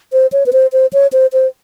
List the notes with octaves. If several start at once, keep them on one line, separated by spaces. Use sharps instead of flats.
C5
C#5
B4
C5
C5
C#5
C5
C5